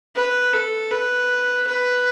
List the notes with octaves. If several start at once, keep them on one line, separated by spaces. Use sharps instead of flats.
B4
A4
B4
B4